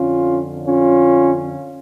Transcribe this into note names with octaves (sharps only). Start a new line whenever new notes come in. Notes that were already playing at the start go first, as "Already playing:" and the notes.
Already playing: F2 D3 C#4 F4
C#4 F4